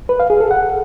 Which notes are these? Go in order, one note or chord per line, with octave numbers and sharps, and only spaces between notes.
B4
F5
G#4
A4
F#5